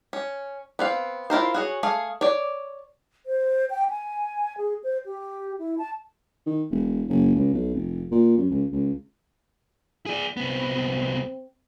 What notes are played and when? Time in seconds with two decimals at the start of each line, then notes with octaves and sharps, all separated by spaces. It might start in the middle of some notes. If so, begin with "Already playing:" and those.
0.13 C#4
0.79 B3 C4 F5
1.30 E4 F4 A#4 C5
1.54 F#4 G#4 C#5
1.83 A3 G#4 F5
2.21 C#5 D5
3.26 C5
3.70 G5
3.90 G#5
4.58 G#4
4.84 C5
5.06 G4
5.59 E4
5.78 A5
6.46 D#3
6.71 E1
7.09 F#1
7.35 C#2
7.53 B1
7.75 F1
8.11 A#2
8.38 F#2
8.51 C#2
8.72 C#2
10.06 G#4 D5
10.37 C2 B3 C4